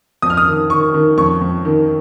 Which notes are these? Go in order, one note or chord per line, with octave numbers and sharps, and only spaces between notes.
F2 D#6
F6
D#6
D#3
D#3 C#6
D#3
F2 C#6
F2
D#3